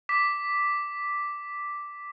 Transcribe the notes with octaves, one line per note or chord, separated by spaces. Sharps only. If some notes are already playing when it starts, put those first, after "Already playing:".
D6 B6